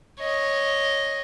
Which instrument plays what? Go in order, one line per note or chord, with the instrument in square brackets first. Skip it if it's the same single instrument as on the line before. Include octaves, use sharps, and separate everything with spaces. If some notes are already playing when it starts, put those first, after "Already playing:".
[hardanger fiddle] C#5 D#5